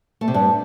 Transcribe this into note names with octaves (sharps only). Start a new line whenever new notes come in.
A3
C3
G2